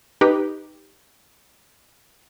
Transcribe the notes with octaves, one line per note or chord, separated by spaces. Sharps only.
D#4 G4 B4